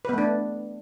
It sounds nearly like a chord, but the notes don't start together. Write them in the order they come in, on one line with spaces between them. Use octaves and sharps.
B4 B3 A3 D4